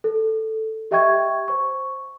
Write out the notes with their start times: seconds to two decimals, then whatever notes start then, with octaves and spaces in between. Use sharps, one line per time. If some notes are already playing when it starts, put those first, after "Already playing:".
0.04 A4
0.91 G4 D#5 E5 G5 C#6 G#6
1.48 C5 C#6